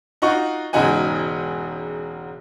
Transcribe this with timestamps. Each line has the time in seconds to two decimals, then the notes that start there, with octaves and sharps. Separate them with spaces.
0.22 D#4 F4 F#4 C#6
0.73 E1 G#2 C#3 D#4 F#4 G#5